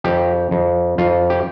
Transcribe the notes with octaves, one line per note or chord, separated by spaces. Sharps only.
F2 G4
F2
F2 F4
G4